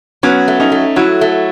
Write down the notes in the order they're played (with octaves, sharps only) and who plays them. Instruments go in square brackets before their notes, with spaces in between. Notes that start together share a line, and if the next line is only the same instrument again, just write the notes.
[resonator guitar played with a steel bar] F#3 [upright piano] B3 C#4
[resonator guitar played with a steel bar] A3
[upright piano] C#4 D#4
[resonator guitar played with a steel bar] A3
[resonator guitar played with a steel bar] F#3 [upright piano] E4 F#4
[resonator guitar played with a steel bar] A3